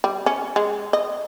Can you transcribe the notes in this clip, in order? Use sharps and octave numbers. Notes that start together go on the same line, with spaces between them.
G3
C#4
G#3
D#5